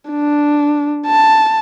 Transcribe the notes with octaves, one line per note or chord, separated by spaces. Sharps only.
D4
A5